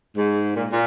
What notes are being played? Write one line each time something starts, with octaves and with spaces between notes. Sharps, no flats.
G#2
A#2
A#2